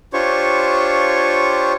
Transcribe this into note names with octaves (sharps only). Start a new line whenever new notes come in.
D4 F4 G4 C5 C#5 C#6